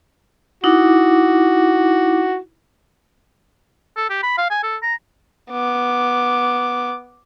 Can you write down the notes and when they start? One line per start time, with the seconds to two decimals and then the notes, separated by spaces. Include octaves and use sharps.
0.64 D#4 E4 F#4 D6
3.96 A4
4.10 G4
4.23 B5
4.38 F5
4.50 G#5
4.63 A4
4.83 A#5
5.51 B3 D6